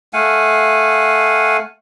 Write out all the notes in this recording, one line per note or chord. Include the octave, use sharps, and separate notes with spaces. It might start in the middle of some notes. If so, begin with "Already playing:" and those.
A3 F5 F#5 G#5